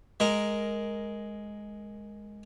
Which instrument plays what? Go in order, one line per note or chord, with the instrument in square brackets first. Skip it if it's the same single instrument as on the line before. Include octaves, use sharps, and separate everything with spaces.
[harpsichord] G#3 A#4